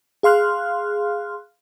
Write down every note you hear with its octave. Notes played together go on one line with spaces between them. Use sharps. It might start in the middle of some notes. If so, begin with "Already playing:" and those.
G#4 F5 C6 F6 F#6